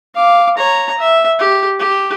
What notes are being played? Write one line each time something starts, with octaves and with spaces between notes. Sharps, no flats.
F5 D6
C#5 A#5
E5
G4
G4